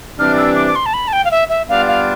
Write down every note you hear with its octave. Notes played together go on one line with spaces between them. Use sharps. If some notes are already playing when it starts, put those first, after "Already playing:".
C3 E3 G3 D4 F6
E6
D6
D6
C6
A5
B5
A5
G5
F5
E5
E5
G3 B3 D4 F4 F5
F5